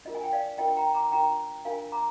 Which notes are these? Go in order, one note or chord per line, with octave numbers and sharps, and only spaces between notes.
D4 F4 A#4 D#5
G#5
G5
D5 F5
D4 F4 A#4 D#5 G5
G5 A#5
A#5 D6
D4 F4 A#4 G5 A#5
D4 F4 A#4 F5 G#5
A#5 D6